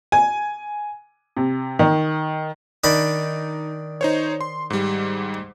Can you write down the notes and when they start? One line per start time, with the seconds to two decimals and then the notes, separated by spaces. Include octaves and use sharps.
0.12 G#5
1.37 C3
1.79 D#3
2.84 D#3 D4 D#4 B5
4.01 D#4 C5 C#5
4.41 C6
4.70 G#2 G3